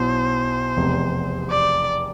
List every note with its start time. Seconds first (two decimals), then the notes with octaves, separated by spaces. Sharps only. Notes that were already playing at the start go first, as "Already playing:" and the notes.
Already playing: B1 B2 E4 C5
0.77 F1 E2 C3
1.50 D5